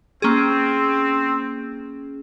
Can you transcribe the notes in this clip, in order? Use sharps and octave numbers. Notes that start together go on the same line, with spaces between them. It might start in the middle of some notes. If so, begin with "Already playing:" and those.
A#3 C4 C#4 G#4